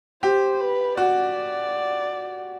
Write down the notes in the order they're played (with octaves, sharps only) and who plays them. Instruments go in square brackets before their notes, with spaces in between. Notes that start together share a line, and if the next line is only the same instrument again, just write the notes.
[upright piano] G4 [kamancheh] C5
[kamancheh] B4
[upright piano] F#4 [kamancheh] D5